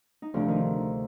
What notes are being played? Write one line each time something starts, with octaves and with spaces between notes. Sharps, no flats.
D#4
D2 C3 F3 D4
D#3 D#4